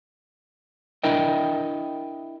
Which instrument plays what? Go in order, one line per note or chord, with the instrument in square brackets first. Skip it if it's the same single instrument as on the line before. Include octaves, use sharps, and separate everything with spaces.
[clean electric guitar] D4 E4 A#4 D#5 E5 G5